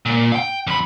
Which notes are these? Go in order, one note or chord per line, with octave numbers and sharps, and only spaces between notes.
A#2
F5 G5
F2 B5